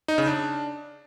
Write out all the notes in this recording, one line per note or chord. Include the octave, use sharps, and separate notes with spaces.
D#4
C#3
D4